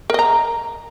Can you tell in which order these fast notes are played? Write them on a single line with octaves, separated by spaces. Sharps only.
A#4 D#5 A#5